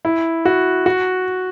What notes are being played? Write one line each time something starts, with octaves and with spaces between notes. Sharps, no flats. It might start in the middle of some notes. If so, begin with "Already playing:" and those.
E4
F#4
F#4